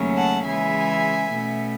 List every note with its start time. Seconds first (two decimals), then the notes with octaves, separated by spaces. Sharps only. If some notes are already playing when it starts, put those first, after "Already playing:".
Already playing: D#2 C#3 F#3 A3 C#4
0.17 F#5 A5
0.44 C#3 E3 G#3 E5 G#5
1.30 B2 A3 C#4